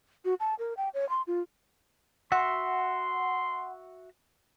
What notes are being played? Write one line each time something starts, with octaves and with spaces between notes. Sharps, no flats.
F#4
A5
A#4
G5
C#5
C6
F4
F#4 E5 F#5 C6